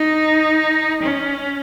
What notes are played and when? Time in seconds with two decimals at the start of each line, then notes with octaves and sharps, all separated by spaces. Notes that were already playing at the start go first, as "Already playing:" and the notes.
Already playing: D#4
1.03 C#4